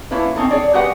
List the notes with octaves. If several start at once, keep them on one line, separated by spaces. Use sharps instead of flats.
A#3 C#4 E4 F4 B4
C4 C#4 D#4 A4
G#4 C#5 D5
G#3 F#4 G4 A#4 B4 F#5